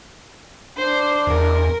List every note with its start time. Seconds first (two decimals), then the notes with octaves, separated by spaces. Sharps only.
0.77 D4 C5
1.27 E2 A#4